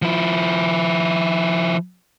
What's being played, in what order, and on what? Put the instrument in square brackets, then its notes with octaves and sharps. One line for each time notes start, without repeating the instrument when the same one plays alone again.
[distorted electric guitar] F3 E4